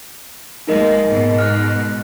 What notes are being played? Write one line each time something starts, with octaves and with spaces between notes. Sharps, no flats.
G#3 A#3 D#4 A#4 D#5
G#2 B2
F6 F#6